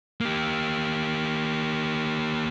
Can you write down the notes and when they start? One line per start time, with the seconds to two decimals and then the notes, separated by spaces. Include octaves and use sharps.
0.21 A#3 G4